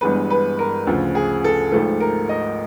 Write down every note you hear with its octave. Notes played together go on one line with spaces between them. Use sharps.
G1 G2 E3 G#3 B3 B4
B4
A#4
D2 C#3 F3
G#4
A4
G#1 G#2 F3 A3 A4
A#4
D#5